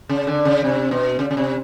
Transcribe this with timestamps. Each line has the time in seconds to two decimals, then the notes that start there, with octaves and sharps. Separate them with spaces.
0.09 C#3
0.27 D3
0.45 C#3
0.64 C3
0.91 B2
1.19 C#3
1.31 C#3
1.37 C3